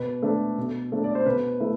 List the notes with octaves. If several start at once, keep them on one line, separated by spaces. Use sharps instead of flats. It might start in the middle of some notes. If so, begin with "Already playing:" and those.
Already playing: B2 B4
A3 D4
B2
A3 D4
D5
C5
B2 B4
A3 E4